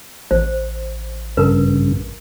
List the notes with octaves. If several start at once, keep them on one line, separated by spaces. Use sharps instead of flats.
A1 C5
G2 C#3 A#4 B4